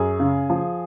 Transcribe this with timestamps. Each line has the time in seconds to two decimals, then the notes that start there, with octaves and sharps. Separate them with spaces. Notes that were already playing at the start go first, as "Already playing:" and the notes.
Already playing: F#2 G#4
0.20 C#3
0.50 F3